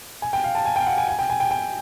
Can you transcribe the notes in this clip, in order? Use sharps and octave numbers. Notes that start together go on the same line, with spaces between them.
G#5
G5
F5
A5
G#5
G5
F5
F#5
G#5
G#5
G5
G#5
G5
G5